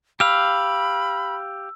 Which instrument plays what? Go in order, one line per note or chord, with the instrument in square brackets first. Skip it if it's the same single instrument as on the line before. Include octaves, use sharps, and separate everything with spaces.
[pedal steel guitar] G4 F5 [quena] B5 [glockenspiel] E6